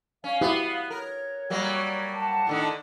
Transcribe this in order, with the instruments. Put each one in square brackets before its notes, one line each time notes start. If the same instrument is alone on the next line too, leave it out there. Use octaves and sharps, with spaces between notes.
[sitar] C#4 [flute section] F5
[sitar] B3 [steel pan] E4 F#4 G4
[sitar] A#4 [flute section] C#5
[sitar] F#3 G3 A#3
[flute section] F#5 A5
[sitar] A2 D3 D#3